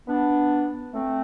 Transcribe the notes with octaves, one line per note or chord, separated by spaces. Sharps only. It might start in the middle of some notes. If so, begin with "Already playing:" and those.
B3 D4
A3 C4